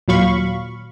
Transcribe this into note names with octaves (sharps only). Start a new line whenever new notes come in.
D#2 A#2 F#3 F5 B5 C#6